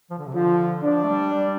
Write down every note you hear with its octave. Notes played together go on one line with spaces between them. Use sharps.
F3
D3
C3
D3 F3
F3 D4
A3
G3
G3